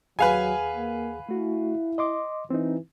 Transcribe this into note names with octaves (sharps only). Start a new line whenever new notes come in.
D#2 F#3 G#4 B4 F5 F#5 G#5
A#3
A3 E4 F#4
D#5 C6 D6
E3 C4 D#4